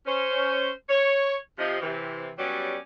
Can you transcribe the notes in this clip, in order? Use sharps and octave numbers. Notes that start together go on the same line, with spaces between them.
C#4 C5
C#5
C3 F3 D#5
C3 E3
F#3 G3 B3 C#4 G4 D5